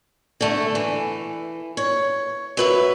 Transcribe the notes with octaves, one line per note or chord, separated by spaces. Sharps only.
D3 A3
E3
C#5
F#3 B4 E5